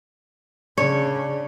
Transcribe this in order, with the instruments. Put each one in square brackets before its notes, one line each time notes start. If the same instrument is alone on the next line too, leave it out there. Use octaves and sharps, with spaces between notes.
[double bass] C#3 [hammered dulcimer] D4 D5 [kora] C#5